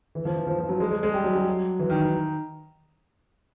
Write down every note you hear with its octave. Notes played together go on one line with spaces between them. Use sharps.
E3
F3
E3
F3
F3
F#3
G#3
G#3
G#3
G3
F#3
F#3
E3
D#3
D#3